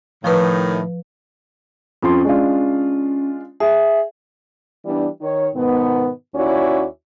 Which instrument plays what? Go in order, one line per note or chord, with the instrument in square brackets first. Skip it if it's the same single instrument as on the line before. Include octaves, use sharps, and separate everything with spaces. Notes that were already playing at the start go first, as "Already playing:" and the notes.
[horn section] A2 D#3 [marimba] F3 B4
[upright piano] F2 F3 C6 [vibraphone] C#4
[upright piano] G#3 D4 F4
[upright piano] G#4 [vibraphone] E5
[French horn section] E3 G3 B3 D4
D#3 C#5
G#2 B2 D#3 B3
D#2 C#4 E4 F#4 D5